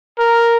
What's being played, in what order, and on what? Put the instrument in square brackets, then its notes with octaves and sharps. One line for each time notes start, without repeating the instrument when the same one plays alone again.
[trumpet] A#4